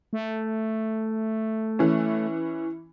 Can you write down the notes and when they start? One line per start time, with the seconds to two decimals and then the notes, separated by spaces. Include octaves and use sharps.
0.13 A3
1.79 E3 C#4